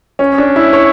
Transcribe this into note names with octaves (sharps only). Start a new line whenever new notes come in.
C#4
D4
E4
C#5